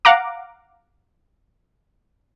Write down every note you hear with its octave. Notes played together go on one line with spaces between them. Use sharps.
F5 F#5 A#5 D6